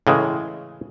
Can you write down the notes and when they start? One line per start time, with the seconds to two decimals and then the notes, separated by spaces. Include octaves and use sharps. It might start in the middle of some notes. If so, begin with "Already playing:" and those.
0.07 A2 C#3 E3 G#3